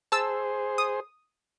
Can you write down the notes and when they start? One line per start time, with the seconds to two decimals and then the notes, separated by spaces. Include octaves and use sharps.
0.12 G#4 C5 A5 E6
0.78 D#6